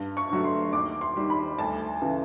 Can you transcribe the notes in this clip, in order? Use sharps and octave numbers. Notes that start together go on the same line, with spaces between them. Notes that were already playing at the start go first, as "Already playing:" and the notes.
Already playing: G2
C#6
D3 F#3 A3
C6
D#2 D6
C6
D#3 G3
B5
D2 A5
C#3 E3